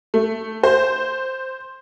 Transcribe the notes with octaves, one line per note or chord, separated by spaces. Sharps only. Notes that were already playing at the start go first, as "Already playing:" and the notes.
A3
C5